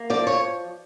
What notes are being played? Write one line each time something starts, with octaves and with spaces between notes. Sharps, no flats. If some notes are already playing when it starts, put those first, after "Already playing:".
Already playing: A#3
F3 D5
C#5